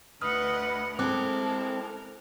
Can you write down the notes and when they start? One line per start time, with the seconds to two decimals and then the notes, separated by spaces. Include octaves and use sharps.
0.22 D2 B4 D#5 F#5 D#6 F6
0.99 G#3 C4 E4 A4 A#4 D6 F#6